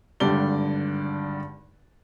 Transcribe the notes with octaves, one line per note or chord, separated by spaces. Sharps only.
G#1 G2 D3 G4 D5 G7